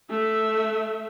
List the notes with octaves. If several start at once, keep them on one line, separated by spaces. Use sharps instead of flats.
A3 E5